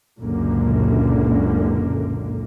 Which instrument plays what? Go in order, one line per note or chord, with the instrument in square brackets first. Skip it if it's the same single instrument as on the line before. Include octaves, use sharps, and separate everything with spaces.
[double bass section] F#1 C#2 F#2 A#2 D3 A#3